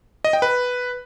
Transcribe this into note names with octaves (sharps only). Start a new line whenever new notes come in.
D#5
G5
B4